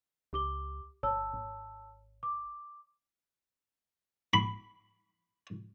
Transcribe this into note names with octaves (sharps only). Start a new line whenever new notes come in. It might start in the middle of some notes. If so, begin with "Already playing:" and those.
C#2 G4 D6 G7
G1 C#5 A5 E6
G#1
D6
B5